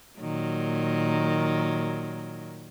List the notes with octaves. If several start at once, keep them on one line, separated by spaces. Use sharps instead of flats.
A#2 D#3 F#3